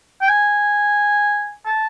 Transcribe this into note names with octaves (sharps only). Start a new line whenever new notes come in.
G5
G#5
A5